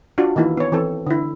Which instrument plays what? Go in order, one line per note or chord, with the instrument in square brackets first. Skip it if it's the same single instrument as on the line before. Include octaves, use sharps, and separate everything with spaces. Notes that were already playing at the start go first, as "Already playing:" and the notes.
[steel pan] D4 F4 F#4
D#3 E3 A#3 E4
B3 C#5
E3 C4 A4
D3 E4